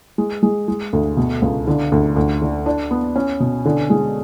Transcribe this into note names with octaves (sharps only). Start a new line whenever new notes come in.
G#3
G#3
G#3
D2
B2
C#2
D3
D2
D2
D3
D4
B3
C#4
B2
D3
G#3